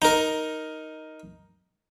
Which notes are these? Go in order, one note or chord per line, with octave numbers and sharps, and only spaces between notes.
D#4 A#4